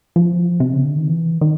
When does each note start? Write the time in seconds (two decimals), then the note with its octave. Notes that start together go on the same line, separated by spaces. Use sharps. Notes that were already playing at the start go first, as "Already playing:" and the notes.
0.16 F3
0.60 C3
0.73 C#3
0.85 D3
0.97 D#3
1.09 E3
1.41 D#3